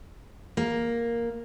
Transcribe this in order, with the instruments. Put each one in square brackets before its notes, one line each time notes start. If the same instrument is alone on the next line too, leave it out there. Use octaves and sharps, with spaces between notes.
[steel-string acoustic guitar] A#3